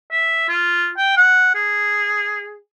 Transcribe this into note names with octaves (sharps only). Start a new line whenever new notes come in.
E5
F4
G5
F#5
G#4